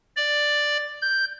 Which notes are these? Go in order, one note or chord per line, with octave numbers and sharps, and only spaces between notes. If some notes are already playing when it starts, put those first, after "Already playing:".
D5
G6